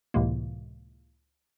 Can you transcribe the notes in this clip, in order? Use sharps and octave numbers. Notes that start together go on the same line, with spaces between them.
C#2 A2 C3 E3 G#3 A#3